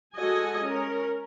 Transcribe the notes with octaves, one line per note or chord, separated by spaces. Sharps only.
G#3 F#4 A4 D#5 G#5
C#4 A#4